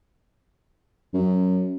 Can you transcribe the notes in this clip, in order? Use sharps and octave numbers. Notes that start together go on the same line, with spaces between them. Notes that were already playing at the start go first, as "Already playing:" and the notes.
F#2